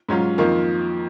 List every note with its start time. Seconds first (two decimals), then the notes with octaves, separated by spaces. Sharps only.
0.09 G#2 F#3 C#4 F4
0.38 F2 D#3 A#3 F4